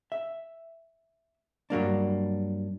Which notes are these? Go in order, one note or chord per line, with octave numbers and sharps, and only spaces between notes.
E5
G2 F#3 A#3 D4